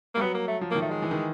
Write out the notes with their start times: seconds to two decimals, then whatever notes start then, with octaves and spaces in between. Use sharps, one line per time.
0.15 G3 A#3
0.21 F#3 B3
0.34 A#3
0.48 A3
0.61 F3
0.71 A#3
0.75 D#3
0.82 A3
0.91 G#3
1.02 E3
1.11 D#3